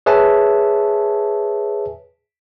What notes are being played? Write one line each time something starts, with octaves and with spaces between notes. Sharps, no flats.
G#4 B4 C#5 E5 G#5 A5